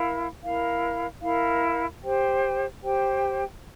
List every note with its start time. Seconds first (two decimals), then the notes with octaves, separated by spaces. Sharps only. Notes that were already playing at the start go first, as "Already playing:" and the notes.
Already playing: E4 A#4 F5
0.43 E4 A#4 F5
1.22 E4 A#4 F5
2.02 G4 C5 G5
2.82 G4 C5 G5